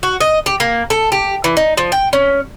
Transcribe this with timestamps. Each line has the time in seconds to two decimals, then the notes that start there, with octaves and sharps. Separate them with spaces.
0.03 F#4
0.21 D#5
0.46 G4
0.60 A#3
0.90 A4
1.12 G4
1.44 E3
1.57 D#4
1.77 F3
1.92 G5
2.13 C#4